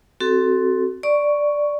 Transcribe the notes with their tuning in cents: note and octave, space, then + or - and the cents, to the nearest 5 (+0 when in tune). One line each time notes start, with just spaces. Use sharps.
C4 +5 F#4 +25 A4 +0
D5 +0 C#6 +5